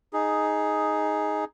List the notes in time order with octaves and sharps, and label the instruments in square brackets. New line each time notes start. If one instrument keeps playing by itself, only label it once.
[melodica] D#4 G#4